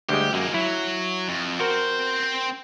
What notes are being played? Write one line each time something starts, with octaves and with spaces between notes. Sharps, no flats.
D2 G3 G#3 G4
F#2 G#3 A#3
F#3 E4
F2
C4 F#4 A#4 C5